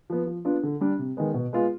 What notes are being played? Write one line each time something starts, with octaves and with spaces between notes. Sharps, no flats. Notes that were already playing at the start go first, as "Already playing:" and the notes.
F3 B3
F3
B3 D4 F4
D3
G3 D4
C3
D#3 G#3 B3
B2
G#3 B3 F4